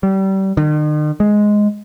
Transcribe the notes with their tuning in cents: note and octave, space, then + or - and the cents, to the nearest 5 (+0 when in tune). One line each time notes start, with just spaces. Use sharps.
G3 -30
D#3 -45
G#3 +5